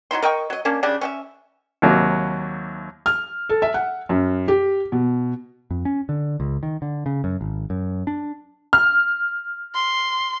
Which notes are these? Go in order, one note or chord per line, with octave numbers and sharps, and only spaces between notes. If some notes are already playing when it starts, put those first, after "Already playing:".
F#3 D#4 E4 C6
A#4 D#5 G5 C#6
F#3 D#5
A#3 C#4 D4
C#3 G3 D4
C#4 G4 E5
D#2 C3 F#3 A#3
F6
A4
E5
F#5
F#2
G4
B2
F2
C#4
D3
C#2
D#3
D3
C#3
F#2
G#1
F#2
D4
F6
C6